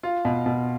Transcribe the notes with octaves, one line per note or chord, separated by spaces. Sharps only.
F4
B2
B2